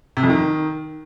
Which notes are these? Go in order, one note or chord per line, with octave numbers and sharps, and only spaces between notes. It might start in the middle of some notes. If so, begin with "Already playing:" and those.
C3
F2
D#3